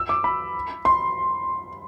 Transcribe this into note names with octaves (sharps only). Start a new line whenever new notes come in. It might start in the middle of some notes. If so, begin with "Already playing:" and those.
Already playing: E6
D6
B5
C6